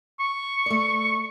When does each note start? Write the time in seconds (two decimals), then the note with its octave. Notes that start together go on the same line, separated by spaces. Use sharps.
0.20 C#6
0.66 A3 D5